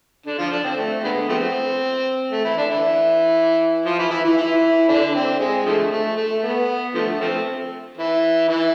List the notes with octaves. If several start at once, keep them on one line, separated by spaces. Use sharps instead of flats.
D3 D4
F3 F4
D3 D4
C4
A3
D3 G#3 B3
F3 A3 C4
A3
E3 E4
D3 D4
E3 E4
F3 F4
E3 E4
E3 E4
E3 E4
E3 E4
D3 D4
C4
G#3
D3 F3 A3
A3
A3
B3
D3 F3 A3
F3 A3 C4
E3 E4
E3 E4